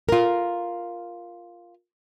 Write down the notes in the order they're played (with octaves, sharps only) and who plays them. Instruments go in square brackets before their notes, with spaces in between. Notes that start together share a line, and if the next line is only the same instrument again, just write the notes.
[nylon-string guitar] F4 A#4